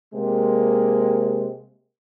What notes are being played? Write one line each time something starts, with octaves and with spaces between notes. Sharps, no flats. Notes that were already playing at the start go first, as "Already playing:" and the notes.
C3 G#3 A#3